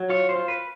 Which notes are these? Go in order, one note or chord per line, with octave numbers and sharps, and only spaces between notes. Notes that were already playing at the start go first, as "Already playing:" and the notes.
Already playing: F#3
F4 C#5
C5
F4
B4